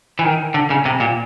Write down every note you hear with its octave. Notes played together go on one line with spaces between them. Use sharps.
E3
D#3
D3
C#3
C3
A#2